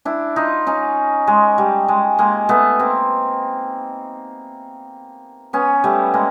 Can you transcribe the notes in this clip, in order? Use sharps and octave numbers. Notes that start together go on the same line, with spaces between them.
D4 E4
D#4 F4
C#4 D#4
G#3
G3
G#3
G#3 A#3
A3 B3
A#3 C4
B3 C#4
G3 A3
G#3 A#3